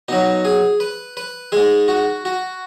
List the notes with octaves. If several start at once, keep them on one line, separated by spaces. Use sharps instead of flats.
B2 F#3 D#4
G#4
B4
B4
G#2 G#3 G#4
F#4
F#4